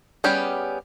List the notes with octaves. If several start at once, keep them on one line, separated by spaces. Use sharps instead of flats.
G3 B3 C#4 G4 G#4